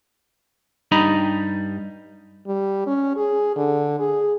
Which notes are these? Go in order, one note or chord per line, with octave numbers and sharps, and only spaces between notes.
G2 G3 D#4 D#5 A#5 B5
G3
C#4
G#4
D3
G#4